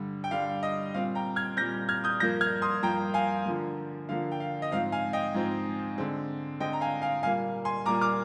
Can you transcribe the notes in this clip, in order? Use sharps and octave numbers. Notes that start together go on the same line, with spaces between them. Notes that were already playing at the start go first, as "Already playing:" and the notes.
Already playing: G2 D3 G3
G5
G2 D3 G3 F5
D#5
A#2 G3 C4 F5
G5 A#5
F6 G#6
A#2 G3 C4 G6 A#6
F6 G#6
D#6 G6
G2 F3 A#3 G6 A#6
F6 G#6
C6 D#6
G2 F3 A#3 G5 A#5
F5 G#5
D3 F3 A#3
D3 F3 A#3 F5
G5
F5
D#5
G#2 F3 C4 F5
F5 G#5
D#5 G5
G#2 F3 C4
D3 G#3 C4
D3 G#3 C4 D#5 G5
A#5
F5 G#5
F5 G#5
A#2 G3 A#3 F5 G#5
G#5 C6
A#2 G3 A#3 A#5 D6
D6 F6